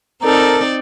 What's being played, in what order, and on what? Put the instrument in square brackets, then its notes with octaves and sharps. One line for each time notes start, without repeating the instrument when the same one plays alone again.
[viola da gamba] C4 D#4 D5 [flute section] A4 A#4 A#5